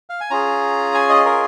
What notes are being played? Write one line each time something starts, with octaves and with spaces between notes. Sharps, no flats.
F5
G#5
C#4 F4 G#4 A#5
G#5
D#5
A#4